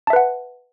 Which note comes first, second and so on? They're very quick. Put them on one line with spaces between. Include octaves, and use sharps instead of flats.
A5 E5 B4 F#5